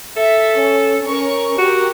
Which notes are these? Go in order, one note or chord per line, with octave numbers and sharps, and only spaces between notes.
A4 E5
C#4
C#4 A#4 C#6
F#4 G4 A#4